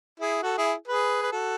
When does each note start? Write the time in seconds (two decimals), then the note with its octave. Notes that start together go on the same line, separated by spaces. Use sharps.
0.20 E4 G#4
0.42 F#4 A4
0.57 E4 G#4
0.87 G#4 B4
1.23 B4
1.32 F#4 A4